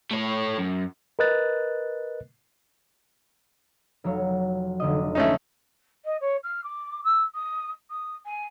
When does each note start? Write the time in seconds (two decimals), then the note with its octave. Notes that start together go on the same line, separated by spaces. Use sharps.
0.11 A3 C#5
0.58 F#2
1.19 A#4 B4 D#5 F#6 A6
4.04 F1 F#3 C#5
4.80 F1 D3 D#5
5.15 A3 C#4 D#4
6.05 D#5
6.21 C#5
6.43 F6
6.64 D6
7.04 E6
7.34 D#6
7.90 D#6
8.26 G#5